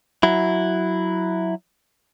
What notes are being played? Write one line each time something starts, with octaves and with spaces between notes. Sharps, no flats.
F#3 E4